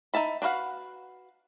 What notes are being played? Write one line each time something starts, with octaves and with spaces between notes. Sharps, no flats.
D#4 E5 A5 B5
D4 F#4 B4 F5 F#5